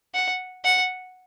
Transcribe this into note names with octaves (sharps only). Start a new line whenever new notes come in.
F#5
F#5